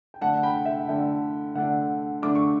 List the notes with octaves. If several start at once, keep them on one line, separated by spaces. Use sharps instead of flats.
G5
D3 A3 D4 F#5 A5
G5 B5
E5 G5
D3 A3 D4 E5 G5
D3 A3 D4 F#5
D3 A3 D4 D6
C#6